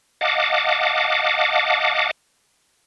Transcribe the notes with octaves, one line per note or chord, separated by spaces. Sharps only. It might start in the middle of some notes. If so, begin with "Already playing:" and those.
D#5 F5 F#5 A5 D6